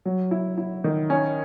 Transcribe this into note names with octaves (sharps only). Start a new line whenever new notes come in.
F#3
E4
E4
D#3
C#4